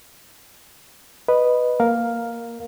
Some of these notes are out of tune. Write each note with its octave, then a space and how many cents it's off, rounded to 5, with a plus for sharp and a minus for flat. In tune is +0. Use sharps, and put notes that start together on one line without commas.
B4 +0 D#5 -10
A#3 +0 A#4 +0 F5 +5